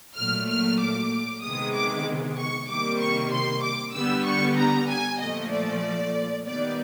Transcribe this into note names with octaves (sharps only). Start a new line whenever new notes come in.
A#2 F#3 A3 F6
F6
D6
C3 D#3 G#3 B3 D#6
D6
C#6
C3 D#3 G3 A#3 D6
C#6
C6
D6
D3 G3 B3 E6
C#6
A#5
G#5
A#2 F3 A3 D#5
D5
D#3 G3 B3 D5